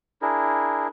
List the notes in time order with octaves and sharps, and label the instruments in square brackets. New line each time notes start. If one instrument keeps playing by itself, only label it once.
[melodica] D4 E4 G#4 A#4